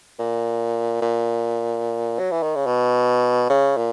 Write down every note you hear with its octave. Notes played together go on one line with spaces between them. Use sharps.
A#2
A#2
F#3
E3
D#3
C#3
B2
C#3
A#2